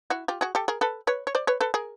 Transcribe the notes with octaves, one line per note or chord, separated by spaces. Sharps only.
E4 F#4
F4 G4
F#4 G#4
G4 A4
G#4 A#4
A4 B4
B4 C#5
C#5
C5 D5
B4 C#5
A4 B4
G#4 A#4